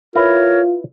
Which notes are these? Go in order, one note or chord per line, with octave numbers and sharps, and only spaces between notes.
E4 F4 A#4 B4 C#5